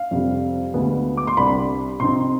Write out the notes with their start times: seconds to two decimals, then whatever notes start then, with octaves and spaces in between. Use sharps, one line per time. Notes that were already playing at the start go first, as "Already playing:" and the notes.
Already playing: F5
0.11 F2 C3 G3
0.74 D2 D3 G#3 B3
1.17 D6
1.27 C6
1.37 C2 C3 G3 D4 B5
2.00 C3 F3 C4 D#4 C6